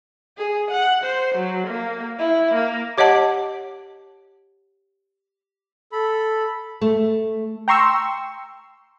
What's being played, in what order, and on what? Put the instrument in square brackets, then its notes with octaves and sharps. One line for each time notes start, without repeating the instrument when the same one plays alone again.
[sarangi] G#4
F#5
C5
F#3
A#3
E4
A#3
[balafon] G4 C#5 D#5 F#5 A5
[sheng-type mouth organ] A4 B5
[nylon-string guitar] A3
[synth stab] G5 A#5 C6 C#6 E6